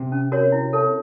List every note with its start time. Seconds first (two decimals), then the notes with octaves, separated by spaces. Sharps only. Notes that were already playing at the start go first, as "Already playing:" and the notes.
Already playing: C3
0.12 C#4
0.32 F#4 A#4 C#5
0.52 E4
0.73 A4 C#5 E5 A5